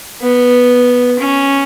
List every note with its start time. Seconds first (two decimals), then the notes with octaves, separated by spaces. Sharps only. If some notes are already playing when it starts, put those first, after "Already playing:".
0.22 B3
1.19 C#4